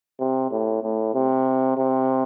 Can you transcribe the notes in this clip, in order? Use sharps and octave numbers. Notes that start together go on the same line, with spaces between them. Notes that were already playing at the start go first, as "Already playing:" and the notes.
C3
A2
A2
C3
C3